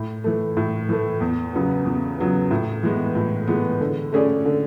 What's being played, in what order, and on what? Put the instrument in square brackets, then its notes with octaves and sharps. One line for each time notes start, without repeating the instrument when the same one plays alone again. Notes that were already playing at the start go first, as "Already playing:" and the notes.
Already playing: [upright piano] A2
E3 A3
A2
E3 A3
E2
C#3 F#3 B3
E2
C#3 F#3 B3
A2
E3 G#3 B3
A2
E3 G#3 B3
D3
A3 C#4 G#4 D5
D3